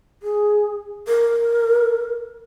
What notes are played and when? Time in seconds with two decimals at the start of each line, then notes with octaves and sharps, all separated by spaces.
0.23 G#4
1.07 A#4